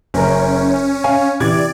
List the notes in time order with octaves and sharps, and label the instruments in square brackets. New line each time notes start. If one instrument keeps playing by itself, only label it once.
[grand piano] F#1 A#4 [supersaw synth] C#4
[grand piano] C#5 F5 G#5
[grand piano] C3 E3 G#6 [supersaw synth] D5